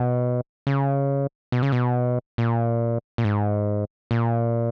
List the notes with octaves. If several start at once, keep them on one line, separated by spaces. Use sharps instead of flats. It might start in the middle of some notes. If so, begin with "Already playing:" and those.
Already playing: B2
C#3
B2
C#3
B2
A#2
A#2
G#2
A#2